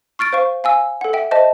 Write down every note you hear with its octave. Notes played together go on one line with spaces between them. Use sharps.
C#6 F6 A6 D7
C5 F5 C#6
F5 G#5 E6
A4 F#5
E5 G5
C5 D#5 E5 A5